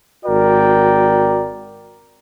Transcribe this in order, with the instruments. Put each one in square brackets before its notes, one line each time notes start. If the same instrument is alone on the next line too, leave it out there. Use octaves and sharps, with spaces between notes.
[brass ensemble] G#1 F#4 A#4 D5 G5